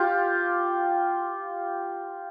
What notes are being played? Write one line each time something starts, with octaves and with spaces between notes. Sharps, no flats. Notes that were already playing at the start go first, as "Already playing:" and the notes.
Already playing: F4 G4